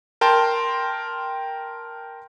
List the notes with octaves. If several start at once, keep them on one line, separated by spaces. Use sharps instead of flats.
A#4 G5 A5 C6